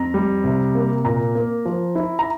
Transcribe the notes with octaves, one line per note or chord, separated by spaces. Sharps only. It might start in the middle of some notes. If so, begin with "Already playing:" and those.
Already playing: F2 A#5
G3
C3
A#3
A#2 A#5
A#3
F3
E4
A#5